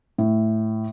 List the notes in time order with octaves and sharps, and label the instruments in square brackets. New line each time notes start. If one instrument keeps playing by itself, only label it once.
[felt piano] A2